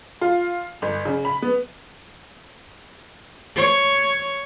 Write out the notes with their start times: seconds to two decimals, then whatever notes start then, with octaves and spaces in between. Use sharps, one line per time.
0.21 F4
0.82 G1
1.05 C#3
1.25 B5
1.42 B3
3.55 C#5